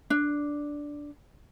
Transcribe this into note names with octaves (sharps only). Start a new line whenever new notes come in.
D4